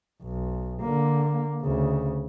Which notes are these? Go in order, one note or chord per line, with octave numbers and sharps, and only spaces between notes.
B1
D3 A#3
D2 C#3